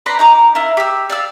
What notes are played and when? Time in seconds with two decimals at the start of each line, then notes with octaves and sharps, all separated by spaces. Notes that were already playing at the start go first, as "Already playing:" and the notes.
0.06 B4 D5 A#5 C6
0.19 D#4 A#5 D6
0.55 E4 F4 A#4
0.77 G4 E6
1.10 D5 F5 E6